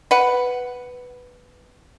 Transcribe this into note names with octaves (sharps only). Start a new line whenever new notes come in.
B4 F#5